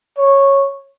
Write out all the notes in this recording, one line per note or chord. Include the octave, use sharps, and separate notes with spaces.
C#5